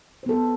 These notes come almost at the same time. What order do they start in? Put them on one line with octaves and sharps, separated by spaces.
C5 B3 A4